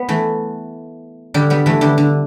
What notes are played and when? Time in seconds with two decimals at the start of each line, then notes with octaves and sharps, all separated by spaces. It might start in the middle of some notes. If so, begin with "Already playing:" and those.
Already playing: B3
0.09 E3 A3
1.34 D3 G3
1.50 G3 B3
1.66 E3 A3
1.81 D3 G3
1.98 D3